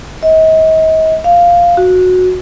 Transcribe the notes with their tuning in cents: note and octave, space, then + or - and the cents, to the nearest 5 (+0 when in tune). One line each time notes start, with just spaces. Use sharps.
D#5 +40
F5 -5
F#4 -15